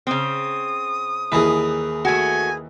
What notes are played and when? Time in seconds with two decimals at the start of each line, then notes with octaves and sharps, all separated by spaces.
0.07 C#3 C4 D#6
1.32 D#2 E3 G#4 A#4 B4
2.05 A3 F#4 G#5